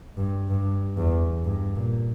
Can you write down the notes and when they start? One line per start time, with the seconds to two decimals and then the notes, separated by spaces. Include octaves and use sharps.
0.17 G2
0.49 G2
0.97 E2
1.44 G2
1.75 A#2